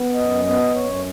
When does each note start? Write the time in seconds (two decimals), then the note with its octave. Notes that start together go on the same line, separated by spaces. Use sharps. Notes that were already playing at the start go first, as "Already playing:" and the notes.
Already playing: B3
0.14 F#2 D#5
0.44 B3 D#5
0.74 F#2 C#5